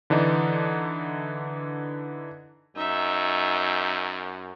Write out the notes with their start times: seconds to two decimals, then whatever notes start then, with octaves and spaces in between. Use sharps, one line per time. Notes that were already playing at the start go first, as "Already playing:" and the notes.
0.10 D3 E3 D4 D#4
2.76 F#2 D#4 E5